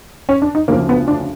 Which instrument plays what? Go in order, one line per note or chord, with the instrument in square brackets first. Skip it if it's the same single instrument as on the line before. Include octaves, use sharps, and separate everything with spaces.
[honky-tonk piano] C#4
D4
D#4
D2 C#3 F3 A#3
B3
D4